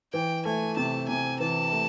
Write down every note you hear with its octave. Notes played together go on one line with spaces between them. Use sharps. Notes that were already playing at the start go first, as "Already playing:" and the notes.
E3 G5
A3 G#5
C3 A5
C3 G#5
E3 A5
A3